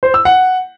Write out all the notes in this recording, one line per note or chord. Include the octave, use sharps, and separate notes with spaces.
C5
E6
F#5